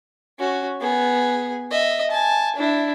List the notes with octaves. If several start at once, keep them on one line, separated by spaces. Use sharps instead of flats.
C#4 F#4
B3 G#4
D#5 E5
G#5 A5
D4 E4